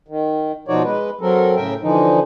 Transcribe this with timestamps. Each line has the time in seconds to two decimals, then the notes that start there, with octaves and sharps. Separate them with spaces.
0.08 D#3
0.68 B2 F3 D#4 F#4 C#5 D5
0.84 G#3 B4
1.21 F#3 C4 A4 A#4
1.56 A2 C#3 A#4 E5 G5
1.82 D3 E3 F3 D#4